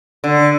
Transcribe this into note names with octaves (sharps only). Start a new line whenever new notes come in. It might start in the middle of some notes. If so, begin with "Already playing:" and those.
D3